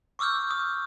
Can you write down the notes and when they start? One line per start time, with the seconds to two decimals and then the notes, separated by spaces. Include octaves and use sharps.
0.19 C#6 D6 E6 F6 G6
0.51 D#6